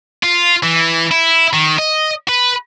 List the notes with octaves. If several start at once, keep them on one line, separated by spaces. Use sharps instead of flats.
F4
E3
E4
D#3
D#5
B4